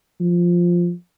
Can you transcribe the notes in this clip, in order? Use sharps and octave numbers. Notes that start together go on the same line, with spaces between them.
F3